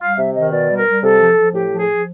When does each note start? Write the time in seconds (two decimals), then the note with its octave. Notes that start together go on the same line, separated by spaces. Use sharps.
0.01 G3 F5
0.18 C3 E5
0.35 D#3 D#5
0.52 B2 D5
0.69 G3
0.78 A#4
0.87 G3
1.02 C3 A4
1.20 F3
1.37 F3
1.54 A2 G4
1.71 F3
1.80 G#4
1.87 F3